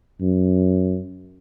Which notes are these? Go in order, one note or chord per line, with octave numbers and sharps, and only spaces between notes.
F#2